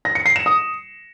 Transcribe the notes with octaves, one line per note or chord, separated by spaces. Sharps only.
A#6
C#7
C7
E7
D#6